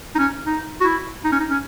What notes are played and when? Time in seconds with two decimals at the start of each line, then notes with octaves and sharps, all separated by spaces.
0.15 D#4
0.19 C#4
0.46 D#4
0.81 F#4
0.84 E4
1.24 D#4
1.32 C#4
1.40 D#4
1.50 C#4